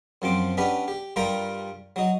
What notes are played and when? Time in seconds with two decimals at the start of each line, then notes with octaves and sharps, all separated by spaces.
0.22 F#2 F3 C4 D6
0.57 B3 C#4 D4 G4 B4
0.88 G4
1.16 G2 G3 F4 A#4 G5 A#5
1.96 F#3 D#4